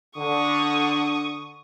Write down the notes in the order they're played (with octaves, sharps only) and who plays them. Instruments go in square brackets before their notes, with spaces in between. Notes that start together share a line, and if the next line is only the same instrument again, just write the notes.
[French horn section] D3 [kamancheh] C#6 D#6